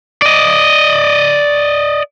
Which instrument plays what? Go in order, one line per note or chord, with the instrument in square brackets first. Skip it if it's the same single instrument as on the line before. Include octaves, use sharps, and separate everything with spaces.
[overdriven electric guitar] D5 D#5